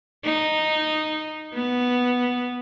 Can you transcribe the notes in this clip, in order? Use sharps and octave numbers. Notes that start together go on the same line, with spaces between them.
D#4
B3